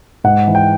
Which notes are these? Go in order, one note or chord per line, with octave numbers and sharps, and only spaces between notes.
G#2 F#5
E3
G5